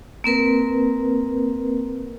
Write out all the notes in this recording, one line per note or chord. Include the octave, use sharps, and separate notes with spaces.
A#3 C4 A#4 B4